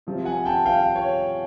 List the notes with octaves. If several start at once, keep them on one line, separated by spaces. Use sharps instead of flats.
C3 F3
F#5 G#5
G5 A5
F5 G5
C#5